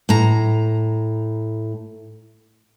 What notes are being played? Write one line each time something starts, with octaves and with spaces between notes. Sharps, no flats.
A2 A#5